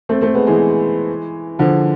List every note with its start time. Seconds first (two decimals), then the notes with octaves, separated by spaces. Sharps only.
0.09 A3 C4
0.21 A3 C4
0.34 G#3 B3
0.47 E3 G#3
1.59 D3 F3